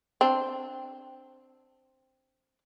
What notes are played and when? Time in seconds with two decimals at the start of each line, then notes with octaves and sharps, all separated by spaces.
0.21 C4 D4